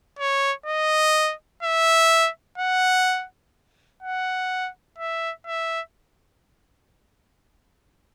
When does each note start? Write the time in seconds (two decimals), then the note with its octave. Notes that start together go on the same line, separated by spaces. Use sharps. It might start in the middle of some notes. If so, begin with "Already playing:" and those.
0.19 C#5
0.66 D#5
1.63 E5
2.58 F#5
4.03 F#5
4.98 E5
5.47 E5